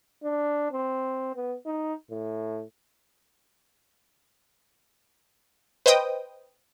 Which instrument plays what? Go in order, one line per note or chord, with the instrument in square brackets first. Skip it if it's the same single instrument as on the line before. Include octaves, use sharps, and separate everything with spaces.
[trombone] D4
C4
B3
D#4
A2
[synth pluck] B4 C5 D#5 G5 D#6